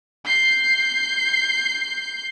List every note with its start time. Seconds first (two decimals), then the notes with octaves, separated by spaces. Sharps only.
0.25 G6 C7